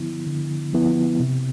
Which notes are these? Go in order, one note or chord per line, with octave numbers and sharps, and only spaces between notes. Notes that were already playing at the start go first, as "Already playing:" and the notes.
Already playing: D3 F3 B3 E4
D3
F3 B3 E4
C3